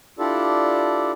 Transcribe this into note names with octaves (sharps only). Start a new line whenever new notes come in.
D4 E4 F4 G4 A4 D5